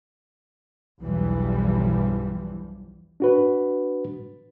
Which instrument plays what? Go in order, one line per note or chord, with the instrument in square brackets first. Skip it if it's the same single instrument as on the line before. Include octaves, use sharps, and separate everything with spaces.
[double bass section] B1 E2 G2 E3 F3 G3
[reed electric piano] D4 F#4 B4